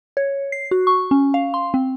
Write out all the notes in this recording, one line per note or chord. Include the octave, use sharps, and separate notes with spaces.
C#5
C7
F#4
C#6
C#4
F5
C6
C4